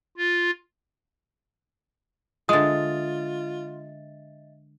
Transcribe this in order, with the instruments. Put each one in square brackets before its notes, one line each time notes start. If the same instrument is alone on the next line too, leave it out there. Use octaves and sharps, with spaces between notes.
[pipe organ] F4
[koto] D3 G#3 [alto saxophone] F4 [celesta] D#5 E5 A6 [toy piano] D#6